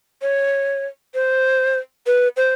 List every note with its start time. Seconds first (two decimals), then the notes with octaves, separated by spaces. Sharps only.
0.22 C#5
1.14 C5
2.07 B4
2.37 C5